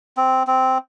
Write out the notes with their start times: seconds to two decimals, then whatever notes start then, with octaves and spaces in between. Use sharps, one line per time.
0.17 C4
0.47 C4